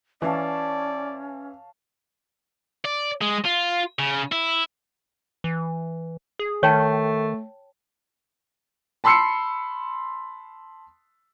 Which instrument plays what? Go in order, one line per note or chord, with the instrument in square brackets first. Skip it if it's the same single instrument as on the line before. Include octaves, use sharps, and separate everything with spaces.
[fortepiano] E3 [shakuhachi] C#4 [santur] C#5 F5 A5 [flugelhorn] D5
[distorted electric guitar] D5
G#3
F4
C#3
E4
[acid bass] E3
G#4
[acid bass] D#3 [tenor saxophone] A3 [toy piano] C#5 G5 A5
[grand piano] A5 B5 C6 E6 C7 C#7